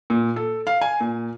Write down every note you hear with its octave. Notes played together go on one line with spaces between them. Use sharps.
A#2
A4
F5
G#5
A#2